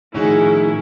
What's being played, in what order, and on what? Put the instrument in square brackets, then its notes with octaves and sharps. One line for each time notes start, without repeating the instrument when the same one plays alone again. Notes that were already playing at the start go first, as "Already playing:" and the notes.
[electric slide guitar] A2 D#3 F3 [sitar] C#4 D#4 F#4 [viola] E4 [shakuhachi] G#4